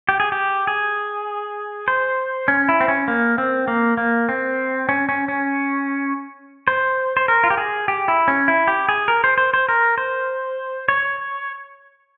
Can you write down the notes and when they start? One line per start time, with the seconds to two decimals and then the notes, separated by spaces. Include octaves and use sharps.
0.09 G4
0.20 G#4
0.32 G4
0.67 G#4
1.88 C5
2.48 C#4
2.69 E4
2.80 C4
2.88 C#4
3.08 A#3
3.38 C4
3.68 A#3
3.97 A#3
4.29 C4
4.89 C#4
5.09 C#4
5.28 C#4
6.68 C5
7.17 C5
7.28 A#4
7.44 F4
7.50 G4
7.58 G#4
7.88 G4
8.08 E4
8.28 C#4
8.48 E4
8.68 G4
8.89 G#4
9.08 A#4
9.24 C5
9.38 C5
9.54 C5
9.69 A#4
9.98 C5
10.89 C#5